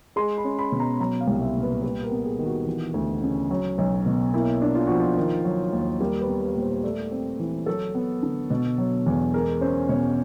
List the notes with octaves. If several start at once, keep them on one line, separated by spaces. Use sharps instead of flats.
G#3 C6
B5
C#4
B5
B2
A#5
F#3 A#5
F5
C2
E5
A#2
B4
G3 B4
A#4
B3
G#4
D#3
F#4
E3
D2
C#3
F#3
B1
B2
A#3 E4
D4
F4
F3 F#4
F4
D#3
F#3
D#2
G3 A#4
B4
B3
B4
A#2
C5
A3 D5
C4
E3
F#3 A4
B3
D3
B2
F#3
E2
G#3 A#4
C#4 C5
B2 C#5